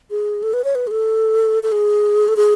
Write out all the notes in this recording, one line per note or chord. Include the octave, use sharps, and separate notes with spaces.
G#4
A4
B4
C#5
B4
G#4
A4
A4
G#4
A4
G#4